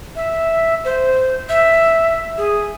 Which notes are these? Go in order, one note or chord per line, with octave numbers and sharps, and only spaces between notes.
E5
C5
E5
G#4